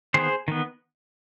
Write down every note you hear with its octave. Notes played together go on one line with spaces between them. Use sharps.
D#3 B3 G#4 C5
D#3 B3